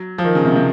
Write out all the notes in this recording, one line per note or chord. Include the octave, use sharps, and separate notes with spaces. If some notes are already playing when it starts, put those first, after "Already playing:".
Already playing: F#3
F3
D#3
C#3
C3
C3